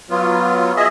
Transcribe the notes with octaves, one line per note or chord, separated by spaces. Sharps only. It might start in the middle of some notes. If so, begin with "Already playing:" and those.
F#3 B3 F4
G#4 D#5 E5